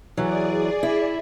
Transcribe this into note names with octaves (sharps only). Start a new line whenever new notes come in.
E3 F#3 G#4 D5
E4